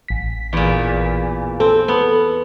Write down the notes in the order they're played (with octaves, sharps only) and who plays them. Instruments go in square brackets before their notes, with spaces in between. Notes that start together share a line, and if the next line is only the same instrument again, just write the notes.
[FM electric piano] A1 B6
[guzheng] E2 A#2
[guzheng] C4 [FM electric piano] A4
[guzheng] B3